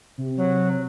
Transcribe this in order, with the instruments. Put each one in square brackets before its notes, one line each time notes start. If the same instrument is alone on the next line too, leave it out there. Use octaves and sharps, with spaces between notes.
[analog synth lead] C3
[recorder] F#3